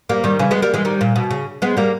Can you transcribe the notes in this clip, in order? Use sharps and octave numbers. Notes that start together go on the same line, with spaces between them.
G3 A#3
D#3 G3
C#3 E3
G#3 B3
G3 A#3
E3 G#3
D#3 G3
A#2
B2
C#3
G#3 B3
G3 A#3